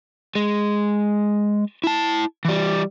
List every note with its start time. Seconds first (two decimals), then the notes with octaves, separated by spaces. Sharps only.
0.35 G#3
1.84 E4 A5
2.45 E3 G3